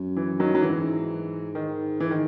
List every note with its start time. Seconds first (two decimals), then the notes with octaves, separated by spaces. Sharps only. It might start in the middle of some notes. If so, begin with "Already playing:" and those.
Already playing: F#2
0.17 E3
0.40 D#3 F#3
0.55 F#3
0.62 G#2 E3
1.55 D#3
2.00 E3
2.11 D#3